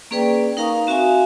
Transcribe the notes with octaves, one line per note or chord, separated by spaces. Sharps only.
A#3 C#4 G#4 B4 D5 G5
D#4 A#4 F5 A#5 C#6 D#6
C4 F#4 E5 F5 G#5